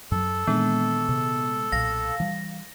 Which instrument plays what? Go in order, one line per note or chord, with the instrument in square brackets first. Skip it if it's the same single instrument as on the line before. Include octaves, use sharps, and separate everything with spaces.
[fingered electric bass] F#2 F#3 [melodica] A4
[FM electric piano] A#2 D#3 G#3 [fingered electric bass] E3 D4 [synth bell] B3
[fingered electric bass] C3
[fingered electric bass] B1 A#2 [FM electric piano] F5 [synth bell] A#6
[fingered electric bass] E3 G3